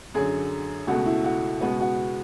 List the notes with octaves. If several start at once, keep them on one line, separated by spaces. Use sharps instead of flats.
F#2 D3 F#3 G#4
C#2 B2 A3 F#4
E4
F#4
C#2 B2 G#3 B3 F#4
F#4